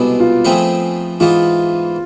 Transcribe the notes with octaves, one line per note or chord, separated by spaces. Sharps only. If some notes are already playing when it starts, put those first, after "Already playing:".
Already playing: C2 B2 G#3 B3 D4 A4
F4
F3 A3 C4 G#4 B4
G#2 E3 B3 F4